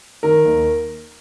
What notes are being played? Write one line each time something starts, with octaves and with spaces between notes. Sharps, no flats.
D#3 A#4
D#2